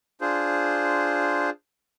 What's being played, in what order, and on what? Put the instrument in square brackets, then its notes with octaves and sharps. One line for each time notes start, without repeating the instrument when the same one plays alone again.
[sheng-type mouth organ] D4 F4 G#4 C5